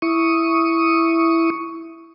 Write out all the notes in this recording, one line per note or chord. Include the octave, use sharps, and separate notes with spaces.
E4 C#6 D#6